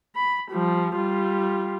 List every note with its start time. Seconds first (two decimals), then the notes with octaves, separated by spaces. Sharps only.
0.15 B5
0.51 F3 G3
0.95 G3 F4